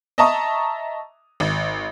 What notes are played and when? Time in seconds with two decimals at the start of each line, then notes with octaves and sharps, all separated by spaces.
0.18 D#5 E5 A5 A#5 C#6 D#6
1.40 G#1